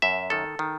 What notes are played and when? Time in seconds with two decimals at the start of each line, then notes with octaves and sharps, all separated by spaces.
0.02 F#2 E5
0.30 D#3 A4
0.59 D#3